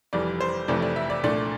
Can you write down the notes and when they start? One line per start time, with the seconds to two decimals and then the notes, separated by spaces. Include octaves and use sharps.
0.13 F1 F2 E3 G3 D5
0.41 C5
0.68 F1 F2 C3 E3 A3 D5
0.82 D5
0.96 E5
1.10 D5
1.24 C2 A#2 A3 D4 D5